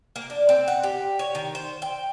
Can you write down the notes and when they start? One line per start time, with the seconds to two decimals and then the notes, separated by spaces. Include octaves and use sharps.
0.16 A#3
0.30 D4
0.49 C4
0.68 F#5
0.83 G4
1.19 C#5
1.35 D#3
1.55 C5
1.82 G5